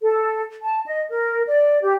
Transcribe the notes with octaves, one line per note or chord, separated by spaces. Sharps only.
A4
A5
D#5
A#4
D5
G4